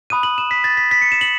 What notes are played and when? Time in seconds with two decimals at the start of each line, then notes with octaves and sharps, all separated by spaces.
0.10 B5 D#6 F#6 D#7
0.23 F#7
0.38 E7
0.51 B6
0.64 A6
0.77 B6
0.91 B6
1.02 C#7
1.12 E7
1.21 F#7